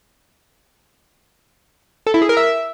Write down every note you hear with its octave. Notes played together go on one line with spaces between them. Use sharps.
A4
E4
G#4
A#4
E5